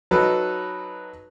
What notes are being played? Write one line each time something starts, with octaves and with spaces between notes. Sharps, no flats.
F#3 D#4 A4 B4